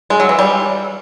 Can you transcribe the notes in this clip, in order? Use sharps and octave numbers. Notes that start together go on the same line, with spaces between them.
G#3
F#3
E3
G3